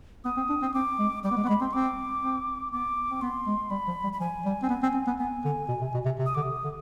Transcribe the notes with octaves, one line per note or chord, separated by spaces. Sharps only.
B3 D#6
C4
D4
C4
C4 D6
G#3
G3 D6
B3
G#3
B3
G#3 B5
C4 C6
C4 D6
C4
B3 D6
C4
B3 C6
G#3
G3 B5
F3
G3
B5
F3 G#5
G3
C4
B3
C4
C4
B3
B3 G#5
D3
B2
C3
B2
C3
C3
D#6
D3 D6
C3 D#6
D3